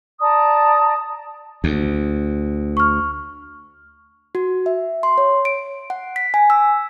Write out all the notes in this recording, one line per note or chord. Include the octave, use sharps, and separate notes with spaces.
D5 A5 A#5 D#6
D2
C#6 F6
F#4
E5
C6
C#5
D7
F#5
B6
G#5
E6